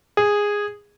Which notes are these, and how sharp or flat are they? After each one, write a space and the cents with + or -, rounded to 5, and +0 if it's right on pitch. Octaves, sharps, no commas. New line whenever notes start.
G#4 -10